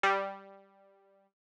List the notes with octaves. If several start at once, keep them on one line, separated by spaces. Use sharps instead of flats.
G3